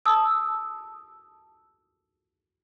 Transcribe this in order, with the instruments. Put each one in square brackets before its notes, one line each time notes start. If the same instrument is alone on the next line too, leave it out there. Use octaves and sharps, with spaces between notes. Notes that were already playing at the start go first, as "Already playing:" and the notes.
[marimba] A5 D#6 E6